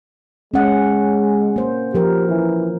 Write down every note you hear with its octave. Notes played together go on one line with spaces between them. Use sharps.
G#3 C#4 F#5
A#3 C5
F3 G4 A#4
E3